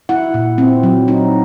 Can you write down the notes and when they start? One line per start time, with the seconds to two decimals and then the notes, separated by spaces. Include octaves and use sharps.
0.09 E4 F#5
0.34 A#2
0.58 C4
0.83 F#3
1.08 D#4